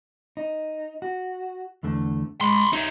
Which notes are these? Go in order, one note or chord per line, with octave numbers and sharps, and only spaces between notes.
D#4
F#4
E2 D3 A3
G#3 B5 C6
D#4 C#5 E5